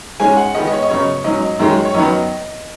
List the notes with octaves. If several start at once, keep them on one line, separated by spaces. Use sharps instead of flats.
G#2 G#3 C#4 G#5
F#5
G#2 D#3 G#3 B3 D#5
D#5
C#5
D#5
F#2 C#3 B3 C#5
G#2 F#3 C#4 D#5
F#2 D#3 G#3 C#4
C#5
F#2 D#3 F#3 B3 D#5